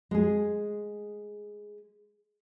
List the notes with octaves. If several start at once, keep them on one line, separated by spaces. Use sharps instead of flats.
G#3 G#4